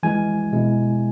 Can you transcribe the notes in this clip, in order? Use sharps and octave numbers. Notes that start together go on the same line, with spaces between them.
E3 G#3 E4 G#5
B2 G#3 B3 E4